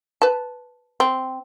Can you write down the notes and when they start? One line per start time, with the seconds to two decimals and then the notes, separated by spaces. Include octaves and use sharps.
0.22 B4 A5
1.00 C4